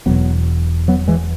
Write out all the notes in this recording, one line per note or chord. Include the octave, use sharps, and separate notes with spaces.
E1 E2 B2 F#3 B3
F#3 B3
E3 G#3